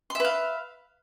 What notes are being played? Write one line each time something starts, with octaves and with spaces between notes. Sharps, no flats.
B4 E5 F5 C6